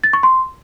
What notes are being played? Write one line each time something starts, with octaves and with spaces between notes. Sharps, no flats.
A6
C#6
C6